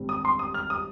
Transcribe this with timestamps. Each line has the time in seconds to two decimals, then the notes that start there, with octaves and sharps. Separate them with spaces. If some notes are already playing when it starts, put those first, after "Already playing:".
Already playing: G#1 G2 G3 C4
0.09 D#6
0.25 C6
0.39 D#6
0.54 F6
0.70 D#6